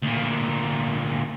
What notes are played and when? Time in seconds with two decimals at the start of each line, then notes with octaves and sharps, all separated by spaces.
0.02 D2 A#2